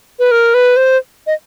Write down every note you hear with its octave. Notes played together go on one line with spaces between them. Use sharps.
B4
A#4
B4
C5
D#5